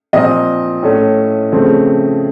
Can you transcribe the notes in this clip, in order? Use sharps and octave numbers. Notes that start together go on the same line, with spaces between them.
A#2 F3 C4 D#5
A2 A3 C#4
C#3 F3 A3 C4